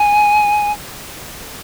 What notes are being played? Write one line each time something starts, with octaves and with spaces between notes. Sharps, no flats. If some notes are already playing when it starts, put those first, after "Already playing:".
Already playing: G#5